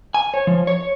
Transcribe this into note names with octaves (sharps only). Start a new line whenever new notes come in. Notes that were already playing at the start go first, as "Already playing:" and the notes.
G#5
C#5
F3
C#5